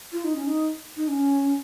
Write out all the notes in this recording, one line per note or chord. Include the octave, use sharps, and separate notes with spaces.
F4
D#4
C#4
D#4
D#4
C#4